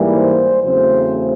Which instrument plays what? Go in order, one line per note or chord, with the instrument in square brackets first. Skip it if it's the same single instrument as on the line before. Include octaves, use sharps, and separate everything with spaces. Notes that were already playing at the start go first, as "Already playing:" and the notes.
Already playing: [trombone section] G#2 E3 G3 A#3
C5
E2 C#3 F#3 A3 C4 C5